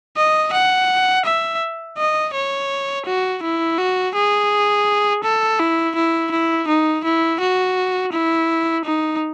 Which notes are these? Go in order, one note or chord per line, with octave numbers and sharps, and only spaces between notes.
D#5
F#5
E5
D#5
C#5
F#4
E4
F#4
G#4
A4
E4
E4
E4
D#4
E4
F#4
E4
D#4